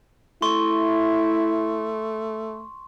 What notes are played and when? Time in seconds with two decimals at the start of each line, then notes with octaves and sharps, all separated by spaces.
0.42 A3 E4 C6 C#6